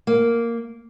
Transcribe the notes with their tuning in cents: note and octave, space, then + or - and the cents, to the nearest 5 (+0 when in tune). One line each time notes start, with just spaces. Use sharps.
A#3 -5